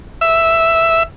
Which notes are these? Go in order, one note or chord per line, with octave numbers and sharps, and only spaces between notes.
E5